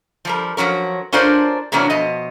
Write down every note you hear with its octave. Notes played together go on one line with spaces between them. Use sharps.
F3 G3 A#4
F3 F#3 C#4 A#4
C#4 D4 F4 A#4 C5 D5
C3 E3 F#3 A#3 C#4 D4
B2 F3 D#5